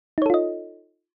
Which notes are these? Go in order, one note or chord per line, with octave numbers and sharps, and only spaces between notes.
D#4 F4 A4 C#5 D#5